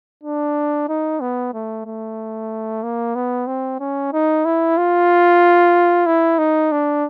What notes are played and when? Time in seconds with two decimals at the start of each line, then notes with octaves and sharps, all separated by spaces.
0.23 D4
0.89 D#4
1.21 B3
1.54 A3
1.86 A3
2.83 A#3
3.15 B3
3.47 C4
3.80 C#4
4.13 D#4
4.45 E4
4.77 F4
6.06 E4
6.39 D#4
6.72 D4